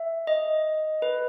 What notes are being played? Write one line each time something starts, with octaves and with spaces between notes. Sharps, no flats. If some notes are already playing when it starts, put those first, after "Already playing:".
Already playing: E5
D#5
B4